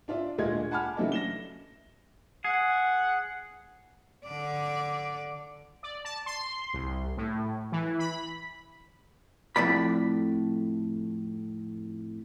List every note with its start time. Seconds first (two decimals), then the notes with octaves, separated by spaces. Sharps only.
0.08 D4 F4 D5 E5
0.38 D2 A#2 G#3 F4 D#5 G#6
0.71 F#5 G#5 A5 B5 D6 F6
0.97 C#3 E3 F#3 A3 D4 D#4
1.12 A#6 E7 G7
2.45 G#4 F#5
4.25 D3 D5
5.83 D5
6.05 A5
6.26 C6
6.74 C2
7.17 A2
7.72 E3
7.99 B5
9.56 F2 A2 D5 B5